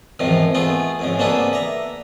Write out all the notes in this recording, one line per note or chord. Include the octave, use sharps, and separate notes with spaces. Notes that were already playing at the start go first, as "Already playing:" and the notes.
E2 G#2 C3 D#3 F3
A3 B3 F4 G#4
F2 G#2 C#3
A#3 B3 D4 G#4 A4 B4
E5 A#5